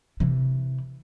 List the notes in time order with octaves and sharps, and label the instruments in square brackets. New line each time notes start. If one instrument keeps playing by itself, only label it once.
[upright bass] C3 E3